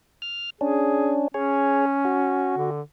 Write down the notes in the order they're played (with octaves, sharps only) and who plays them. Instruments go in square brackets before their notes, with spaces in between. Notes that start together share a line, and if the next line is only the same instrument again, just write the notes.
[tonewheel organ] F6
[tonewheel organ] C#4 D4 [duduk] G#4
[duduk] C#4 [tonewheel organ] G#4 C#5
[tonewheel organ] F#4
[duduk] D3